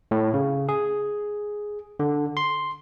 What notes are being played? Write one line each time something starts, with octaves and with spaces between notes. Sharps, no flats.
A2
C#3
G#4
D3
C6